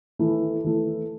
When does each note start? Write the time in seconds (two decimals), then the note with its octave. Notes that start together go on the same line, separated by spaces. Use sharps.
0.19 E3 A3 E4
0.64 E3 A3 E4